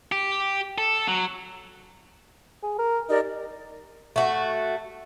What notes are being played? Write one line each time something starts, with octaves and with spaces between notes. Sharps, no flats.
G4
A4
F#3
G#4
A#4
D#4 G4 A#4 D5
A3 F#4